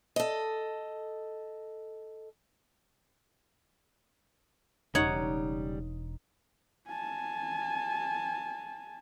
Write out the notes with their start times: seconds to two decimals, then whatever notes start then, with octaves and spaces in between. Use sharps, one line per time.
0.16 A4 D#5
4.95 E1 C#3 G3 D#4 C#5 D#5 F#5
6.87 G#5 A5